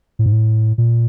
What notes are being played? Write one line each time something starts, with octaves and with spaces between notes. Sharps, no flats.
A2
G#2
A2
A#2